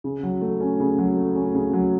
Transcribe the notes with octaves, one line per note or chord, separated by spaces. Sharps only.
C#3
F#3
A3
C#4
C#3
F#3
A3
C#4
C#3
F#3